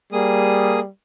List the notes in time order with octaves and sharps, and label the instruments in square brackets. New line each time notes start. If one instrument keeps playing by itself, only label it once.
[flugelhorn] G3 [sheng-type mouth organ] A#3 G#4 D#6